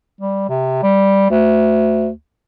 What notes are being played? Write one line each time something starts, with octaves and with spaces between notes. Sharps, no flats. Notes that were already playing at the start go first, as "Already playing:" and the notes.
G3
C3
G3
D2